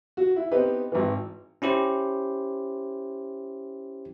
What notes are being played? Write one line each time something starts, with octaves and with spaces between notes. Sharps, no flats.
F#4
E4
B3 C4 D#4 G4 B4
G#1 E3
C#4 E4 G4 C5